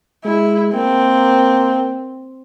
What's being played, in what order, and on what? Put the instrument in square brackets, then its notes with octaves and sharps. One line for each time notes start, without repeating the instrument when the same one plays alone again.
[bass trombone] G#3 [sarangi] E4
[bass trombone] A#3 [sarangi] C4